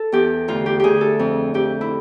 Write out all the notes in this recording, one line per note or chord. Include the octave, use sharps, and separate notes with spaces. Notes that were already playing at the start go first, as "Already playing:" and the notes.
Already playing: A4
E2 G4
D2 F4
G4
D2 G4 G#4
A4
F2
F2 G4
E4